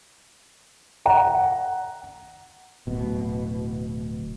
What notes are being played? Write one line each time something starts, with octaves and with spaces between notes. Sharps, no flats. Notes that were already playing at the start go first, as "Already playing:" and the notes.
F#5 A#5
D1 B2